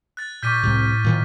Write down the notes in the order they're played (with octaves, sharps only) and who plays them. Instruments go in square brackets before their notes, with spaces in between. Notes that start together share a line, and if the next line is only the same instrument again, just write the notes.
[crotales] F#6 A6
[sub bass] A#2 [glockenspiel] C#6 D6 G6 [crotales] F6 B6 D#7
[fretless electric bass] C2 C3 [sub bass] A2
[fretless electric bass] A#2 D#3 F3